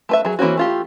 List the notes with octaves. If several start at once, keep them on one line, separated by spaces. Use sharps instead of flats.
A3 B4 E5
F#3 G#4
E3 A#3 C4 C#4 F#4
A3 F4 G4